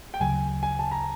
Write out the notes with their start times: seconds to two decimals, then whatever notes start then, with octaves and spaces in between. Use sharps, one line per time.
0.14 G5
0.20 D2 C#3 F#3 G#5
0.63 G#5
0.79 A5
0.91 A#5